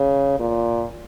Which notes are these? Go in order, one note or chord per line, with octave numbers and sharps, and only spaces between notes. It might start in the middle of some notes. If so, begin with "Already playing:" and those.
Already playing: C#3
A#2